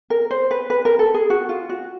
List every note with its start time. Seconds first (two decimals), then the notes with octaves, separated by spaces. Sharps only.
0.10 A#4
0.31 C5
0.51 B4
0.70 B4
0.85 A#4
0.99 A4
1.14 G#4
1.30 F#4
1.49 F4
1.69 F#4